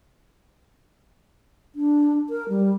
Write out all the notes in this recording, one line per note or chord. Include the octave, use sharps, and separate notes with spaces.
D4
A#4
G3